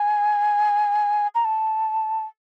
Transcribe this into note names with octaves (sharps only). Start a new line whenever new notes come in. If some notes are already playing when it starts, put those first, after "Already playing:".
Already playing: G#5
A#5
A5